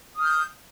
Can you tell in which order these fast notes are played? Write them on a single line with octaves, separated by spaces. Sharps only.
D#6 F6 G6